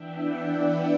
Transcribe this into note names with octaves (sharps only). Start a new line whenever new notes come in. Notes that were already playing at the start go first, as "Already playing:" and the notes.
Already playing: E3 B3 D4 E5 G5
D5 F#5
B4 D5